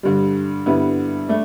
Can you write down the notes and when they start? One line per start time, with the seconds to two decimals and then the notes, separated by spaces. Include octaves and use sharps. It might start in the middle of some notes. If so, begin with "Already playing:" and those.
0.03 G2 D3 G3
0.66 G2 D3 G3 B3 E4
1.28 A3 D4